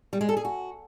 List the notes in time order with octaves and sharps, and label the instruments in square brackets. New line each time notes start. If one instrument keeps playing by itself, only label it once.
[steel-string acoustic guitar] G3
G#3
A4
G#4
F#4